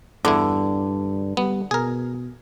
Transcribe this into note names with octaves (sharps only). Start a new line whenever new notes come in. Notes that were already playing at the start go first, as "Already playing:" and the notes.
E2 G2 D3 E4
G3 B3
B2 G#4 A#4